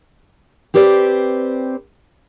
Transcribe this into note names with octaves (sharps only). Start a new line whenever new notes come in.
C4 G4 B4 C5 D5